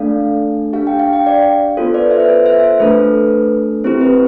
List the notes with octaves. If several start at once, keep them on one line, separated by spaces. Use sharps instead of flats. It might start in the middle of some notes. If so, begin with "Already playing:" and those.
Already playing: A3 D4 A4 D5 F5
D4 G4 F5
G5
F5
G5
D5 F5
B3 F4 A4 C5
B4 D5
C5 E5
B4
C5
C5 E5
C5
A3 D4 A4 B4
C4 E4 G4 C5
B4